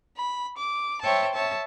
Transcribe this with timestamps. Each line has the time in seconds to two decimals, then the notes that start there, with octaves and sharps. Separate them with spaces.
0.17 B5
0.56 D6
1.01 C5 C#5 E5 G5 A5
1.33 C#5 E5 A5